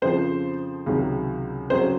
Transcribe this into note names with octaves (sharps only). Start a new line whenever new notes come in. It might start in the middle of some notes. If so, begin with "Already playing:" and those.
F2 C#3 F3 C5
C#2 C3 D#3 F#3
F2 C#3 F#3 C5